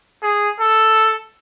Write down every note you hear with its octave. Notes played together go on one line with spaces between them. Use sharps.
G#4
A4